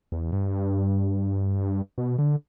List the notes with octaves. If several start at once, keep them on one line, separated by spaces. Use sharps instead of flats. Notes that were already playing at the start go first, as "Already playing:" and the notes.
E2
G2
B2
D3